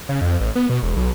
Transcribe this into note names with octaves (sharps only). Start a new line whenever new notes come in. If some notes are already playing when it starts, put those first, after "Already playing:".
C#3
F2
A1
B3
B2
E1
B1